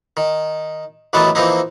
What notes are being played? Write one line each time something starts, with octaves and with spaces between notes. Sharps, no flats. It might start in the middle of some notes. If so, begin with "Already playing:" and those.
D#3
A1 D#3 E3 F#3 B3 A5
E3 F3 A#3 C4 D#4